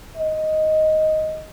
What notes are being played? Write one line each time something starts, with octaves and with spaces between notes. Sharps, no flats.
D#5